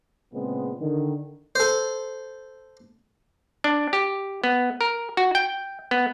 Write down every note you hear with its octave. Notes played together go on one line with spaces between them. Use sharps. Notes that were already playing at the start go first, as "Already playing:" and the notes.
A#2 C#3 G#3 B3 C4
D3 D#3
A4 C5
D4
G4
B3
A#4
F#4
G5
B3